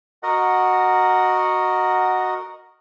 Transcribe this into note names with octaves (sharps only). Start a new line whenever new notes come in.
F#4 A#4 D#5 F#5